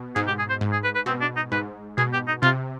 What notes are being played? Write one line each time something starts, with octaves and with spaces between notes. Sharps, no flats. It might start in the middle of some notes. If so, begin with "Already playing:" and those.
Already playing: B2
G#2 G#4
G4
G#4
C5
G#2
G#4
B4
B4
B2 C4
D4
D#4
G#2 B4
B2 G#4
G4
D#4
C3 F4